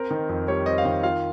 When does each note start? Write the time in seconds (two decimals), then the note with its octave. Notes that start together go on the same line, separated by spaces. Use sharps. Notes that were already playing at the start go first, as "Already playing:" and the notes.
Already playing: C4 A#4
0.11 D#3
0.29 F2
0.48 G3 C#5
0.66 C4 D#5
0.78 F5
0.85 D#3 D#5
1.03 F4 F5